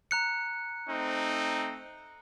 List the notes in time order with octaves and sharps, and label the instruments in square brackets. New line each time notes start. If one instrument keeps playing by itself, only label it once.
[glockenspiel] A#5 F#6 C#7
[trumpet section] A3 C4 D#4